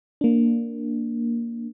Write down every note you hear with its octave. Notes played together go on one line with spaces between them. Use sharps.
A#3 D4